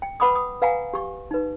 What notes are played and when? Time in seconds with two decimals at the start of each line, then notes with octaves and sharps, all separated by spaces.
0.02 G5
0.20 B4 F#5 B5 D6 D#6
0.35 D#6
0.62 B4 F5 F#5 G#5 A#5
0.94 G4 C#6
1.31 D#4 B4